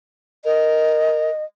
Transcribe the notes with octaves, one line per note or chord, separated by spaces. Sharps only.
A#4 D#5